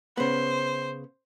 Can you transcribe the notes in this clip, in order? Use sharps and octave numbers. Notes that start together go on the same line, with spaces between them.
C#3 B3 C5